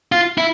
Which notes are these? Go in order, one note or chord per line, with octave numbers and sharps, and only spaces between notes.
F4
E4